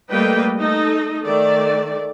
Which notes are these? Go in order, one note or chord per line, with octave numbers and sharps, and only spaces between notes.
G3 A3 A#3 B4 D#5 G5
A3 D#4 A4 D#5
D#3 A3 D5